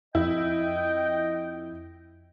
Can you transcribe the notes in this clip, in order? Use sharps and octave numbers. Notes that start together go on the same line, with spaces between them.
F2 E4 D#5 G5